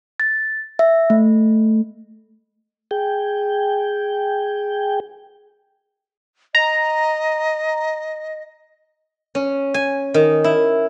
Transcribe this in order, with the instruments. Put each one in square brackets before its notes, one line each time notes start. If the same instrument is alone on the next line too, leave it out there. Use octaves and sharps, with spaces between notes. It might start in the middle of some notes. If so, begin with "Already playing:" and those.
[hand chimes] A6
E5
A3
[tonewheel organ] G#4 G5
[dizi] D#5 [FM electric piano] A#5
[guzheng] C#4
G#5
D#3
E4